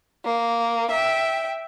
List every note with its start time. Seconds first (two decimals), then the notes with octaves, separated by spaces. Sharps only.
0.25 A#3
0.91 E5 G5